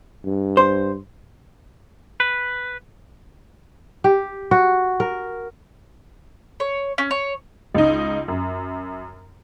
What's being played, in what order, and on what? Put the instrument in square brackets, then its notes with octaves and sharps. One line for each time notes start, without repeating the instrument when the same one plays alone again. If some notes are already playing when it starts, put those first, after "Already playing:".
[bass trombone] G2
[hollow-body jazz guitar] C5
[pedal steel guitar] B4
[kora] G4
F#4
A#4
[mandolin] C#5
C#4
C#5
[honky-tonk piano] C#2 D#4
F#2